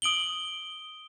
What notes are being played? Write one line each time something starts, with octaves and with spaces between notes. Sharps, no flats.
D#6 D7 F#7 G7